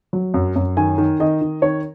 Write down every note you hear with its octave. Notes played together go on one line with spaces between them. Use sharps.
F#3
F#2
F#2
D#3 G#5
D#3
D#3 D#5
D#3
D#3 C#5